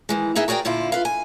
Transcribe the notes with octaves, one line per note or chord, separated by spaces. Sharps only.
D#3 E3 G#3
B3 D#4 G#4 A#4 E5
F#4 G#4 A#4 D5 G5
A#2 D3 E4 F4
F4 B4 F5
G#5